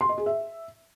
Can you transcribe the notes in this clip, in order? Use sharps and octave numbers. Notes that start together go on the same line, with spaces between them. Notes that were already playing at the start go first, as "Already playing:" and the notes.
C6
D#5
G#4
E5